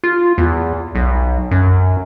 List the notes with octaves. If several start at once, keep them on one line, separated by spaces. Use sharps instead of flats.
F4
E2
B1
F#2